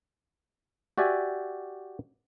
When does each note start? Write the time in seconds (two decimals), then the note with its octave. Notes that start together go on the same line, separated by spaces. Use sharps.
0.98 F#4 G4 D5 E5 G#5